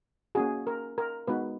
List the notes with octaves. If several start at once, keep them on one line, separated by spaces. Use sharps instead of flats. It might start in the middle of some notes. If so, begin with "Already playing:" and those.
A#3 C#4 F#4 G#4
A#4
A#4
G#3 B3 D#4 F#4 B4